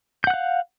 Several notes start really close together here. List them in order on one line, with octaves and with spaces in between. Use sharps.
G6 F#5 F#6 F5